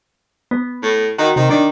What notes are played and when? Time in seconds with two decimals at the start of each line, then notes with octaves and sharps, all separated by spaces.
0.51 B3
0.82 A2
1.18 D#3 F#4
1.36 C3 D#3
1.50 D#3 D4